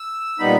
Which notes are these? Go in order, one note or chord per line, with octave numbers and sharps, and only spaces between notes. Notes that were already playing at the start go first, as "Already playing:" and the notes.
Already playing: E6
A#2 G3 B3 D#4 B5